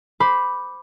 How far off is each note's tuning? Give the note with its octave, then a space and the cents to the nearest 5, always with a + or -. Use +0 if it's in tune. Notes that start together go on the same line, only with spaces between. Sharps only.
C5 -10 B5 +0 D6 +0